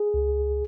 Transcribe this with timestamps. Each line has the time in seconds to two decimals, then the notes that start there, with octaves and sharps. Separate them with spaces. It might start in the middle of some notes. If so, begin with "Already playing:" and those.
Already playing: G#4
0.14 C#2